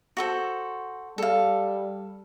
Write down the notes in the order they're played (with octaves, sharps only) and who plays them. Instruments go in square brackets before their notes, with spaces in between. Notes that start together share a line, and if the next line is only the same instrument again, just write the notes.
[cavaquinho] F#4 A4 C5
[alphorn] G3 [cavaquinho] A4 F5